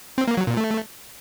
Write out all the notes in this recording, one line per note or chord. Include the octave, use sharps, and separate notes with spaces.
C4
A#3
F#3
A#2
A3